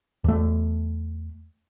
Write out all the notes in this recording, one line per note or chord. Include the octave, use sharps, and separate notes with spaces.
E2 A3